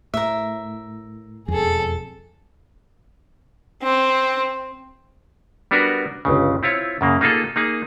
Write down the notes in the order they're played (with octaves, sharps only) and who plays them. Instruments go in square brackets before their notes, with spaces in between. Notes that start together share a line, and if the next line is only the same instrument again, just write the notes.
[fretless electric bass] A2 [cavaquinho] A#4 E5
[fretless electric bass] E1 F2 [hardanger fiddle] G#4 A4
[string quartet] C4
[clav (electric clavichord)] G3 B3 D4 F#4 A#4 B4
G1 C#2 C#3
C4 E4 F4 C#5
F#2 C#3 A#3
A#3 D#4 F4 G#4 A4
A#3 D#4 G#4